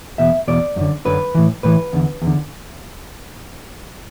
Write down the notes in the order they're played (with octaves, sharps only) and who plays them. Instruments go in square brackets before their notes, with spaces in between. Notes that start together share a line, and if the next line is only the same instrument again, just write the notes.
[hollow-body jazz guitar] E2 B2 E5
E2 B2 D5
F#2 D3
F#2 D3 B4
A2 E3
A2 E3 B4
E2 D3
E2
D3